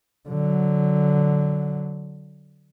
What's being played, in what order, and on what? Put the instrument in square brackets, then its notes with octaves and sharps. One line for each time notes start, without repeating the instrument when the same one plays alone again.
[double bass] D3 F#3